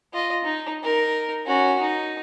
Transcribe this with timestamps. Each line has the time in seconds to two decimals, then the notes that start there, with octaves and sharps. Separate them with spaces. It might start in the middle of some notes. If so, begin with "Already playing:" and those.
0.13 F4 D#5
0.44 D#4
0.83 D#4 A#4
1.46 C#4 F#4
1.80 D#4